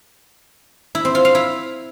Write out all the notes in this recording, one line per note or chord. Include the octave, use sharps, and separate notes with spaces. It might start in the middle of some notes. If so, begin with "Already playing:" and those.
E4
C4
F4
F5
E4